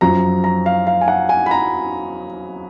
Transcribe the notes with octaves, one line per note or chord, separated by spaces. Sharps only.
F#2 F3 A#5
A#5
F5
F5
G#5
F#5
G#5
B5
A#5